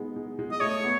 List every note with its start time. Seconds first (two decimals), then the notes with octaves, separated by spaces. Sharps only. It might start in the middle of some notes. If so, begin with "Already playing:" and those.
Already playing: G#3 B3 D#4
0.16 G#3
0.39 G#3
0.52 D#5
0.60 A3 C#5
0.84 B3